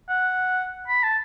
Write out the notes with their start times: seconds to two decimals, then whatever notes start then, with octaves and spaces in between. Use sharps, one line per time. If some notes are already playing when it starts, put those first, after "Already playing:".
0.09 F#5
0.88 B5
1.03 A5